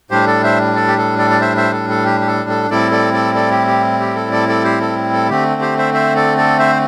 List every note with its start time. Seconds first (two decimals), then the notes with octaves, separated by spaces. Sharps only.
0.11 A2 G3 D4 G4 C5
0.27 A4 D5
0.44 C5 E5
0.75 A4 D5
0.88 G4
0.98 A4
1.19 A4 D5
1.31 D5
1.41 C5 E5
1.56 C5 E5
1.73 A4
1.90 A4
2.05 G4
2.21 G4
2.27 A4
2.49 A4
2.70 A2 G3 C4 E4 A4 D5
2.91 A4 D5
3.14 A4 D5
3.35 A4 D5
3.51 G4
3.67 G4
4.01 G4
4.16 A4
4.32 A4 D5
4.49 A4 D5
4.64 G4 C5
4.81 A4
5.13 A4
5.29 D3 A3 C4 G4
5.61 G4 C5
5.78 C5 E5
5.94 C5 E5
6.15 A4 D5
6.37 A4 D5
6.59 C5 E5